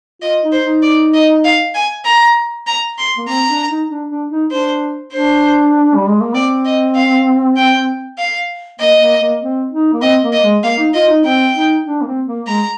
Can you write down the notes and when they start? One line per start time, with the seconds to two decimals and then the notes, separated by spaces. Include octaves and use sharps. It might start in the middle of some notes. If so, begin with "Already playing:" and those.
0.22 F4 D#5
0.43 D#4
0.52 C5
0.63 D#4
0.83 D5
1.14 D#5
1.45 F5
1.75 G#5
2.05 A#5
2.67 A#5
2.98 C6
3.17 A#3
3.28 C4 A#5
3.49 D4
3.69 D#4
3.89 D4
4.10 D4
4.30 D#4
4.51 D4 C5
5.12 D4 C5
5.95 G3
6.08 G#3
6.21 A#3
6.34 C4 D5
6.65 D#5
6.95 F5
7.57 G5
8.18 F5
8.80 A#3 D#5
9.00 A#3
9.20 A#3
9.41 C4
9.71 D#4
9.93 A#3
10.02 C4 D#5
10.23 A#3
10.33 D#5
10.43 G#3
10.63 A#3 F5
10.78 D#4
10.94 F4 D#5
11.09 D#4
11.24 C4 G5
11.55 D#4
11.86 D4
12.02 A#3
12.06 C4
12.27 A#3
12.47 G#3 A#5